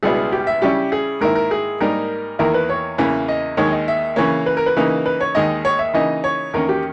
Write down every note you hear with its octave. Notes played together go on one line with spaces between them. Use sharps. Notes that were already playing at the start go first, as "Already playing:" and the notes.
C#2 B2 G3 B3 E4 G#4
G4
E5
C#3 G3 C#4 E4 G4
G#4
G#2 D#3 A#3 E4 A#4
A#4
G#4
G#2 G3 A#3 D#4 A#4
E2 D#3 A#3 E4 A#4
B4
C#5
E2 C#3 E3 A#3
D#5
D#2 D#3 G#3 C#5
D#5
E5
C#3 E3 A#3 C#5
B4
A#4
B4
C#3 E3 A#3 D#4
B4
C#5
D#2 D#3 G#3 D#4 D#5
C#5
E5
C#3 E3 A#3 D#4 D#5
C#5
E2 D#3 A#3 C#4 A#4
G4